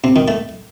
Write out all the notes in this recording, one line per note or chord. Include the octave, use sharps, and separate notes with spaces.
C3
D#3
A3